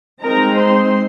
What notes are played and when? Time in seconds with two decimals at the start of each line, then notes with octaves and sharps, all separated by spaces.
0.22 G#3 C4 D#4 A#4 A#5
0.57 C5 C6